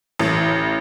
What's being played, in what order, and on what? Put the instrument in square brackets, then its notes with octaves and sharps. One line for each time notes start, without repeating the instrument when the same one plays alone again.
[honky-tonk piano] A1